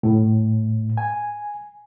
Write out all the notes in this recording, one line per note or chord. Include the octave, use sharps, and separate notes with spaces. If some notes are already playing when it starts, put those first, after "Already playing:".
A2
G#5